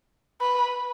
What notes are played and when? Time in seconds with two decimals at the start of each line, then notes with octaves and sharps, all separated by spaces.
0.41 B4